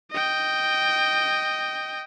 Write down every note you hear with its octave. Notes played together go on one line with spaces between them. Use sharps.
D#5 G5